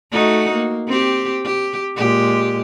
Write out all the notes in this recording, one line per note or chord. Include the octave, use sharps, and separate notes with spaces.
A3 D#4 F#4
A#3
C4 G4
G4
A#2 G#3 G4